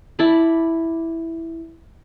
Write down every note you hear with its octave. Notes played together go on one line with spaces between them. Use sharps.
E4 D5 A5 B5